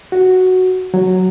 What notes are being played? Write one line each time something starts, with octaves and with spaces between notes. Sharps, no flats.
F#4
F#3